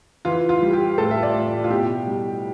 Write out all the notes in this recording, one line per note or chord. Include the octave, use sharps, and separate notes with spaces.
E3 F4
F4
G3
G4
A2 A4
E5
D5
A2
F4
B2 G4
G3